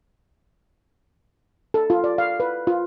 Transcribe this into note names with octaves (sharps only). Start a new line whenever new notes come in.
A4
F4
D5
F5
B4
F4